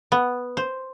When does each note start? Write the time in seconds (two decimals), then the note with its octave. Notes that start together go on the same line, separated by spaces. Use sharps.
0.12 B3
0.57 C5